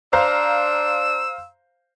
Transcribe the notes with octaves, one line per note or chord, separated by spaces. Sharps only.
D4 C5 F5 A#5 E6